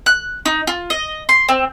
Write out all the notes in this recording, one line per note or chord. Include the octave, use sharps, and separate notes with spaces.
F#6
D#4
F4
D#5
C6
C4